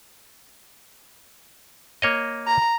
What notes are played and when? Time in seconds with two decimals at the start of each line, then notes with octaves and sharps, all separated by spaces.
2.02 A#3 C#5 D#5
2.47 A#5